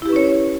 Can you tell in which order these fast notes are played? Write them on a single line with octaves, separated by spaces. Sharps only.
E4 G4 B4 C#4 C#5